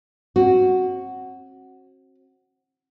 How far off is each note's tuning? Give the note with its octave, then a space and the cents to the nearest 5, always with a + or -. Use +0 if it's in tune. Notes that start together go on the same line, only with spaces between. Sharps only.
C4 +40 F#4 +0